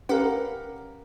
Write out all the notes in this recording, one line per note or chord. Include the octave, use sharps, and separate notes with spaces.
C#4 G4 A#4 B4 F5 F#5